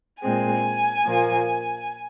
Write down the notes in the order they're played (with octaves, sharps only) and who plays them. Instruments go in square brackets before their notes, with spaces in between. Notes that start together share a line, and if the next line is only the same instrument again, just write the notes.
[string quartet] A#2 G#3 C4 G#5
A#2 F3 A#3